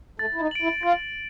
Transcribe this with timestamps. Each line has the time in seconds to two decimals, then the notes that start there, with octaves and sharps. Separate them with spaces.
0.19 A3 A6
0.35 E4
0.41 D#4
0.51 D7 F#7
0.62 E4
0.83 F4 A6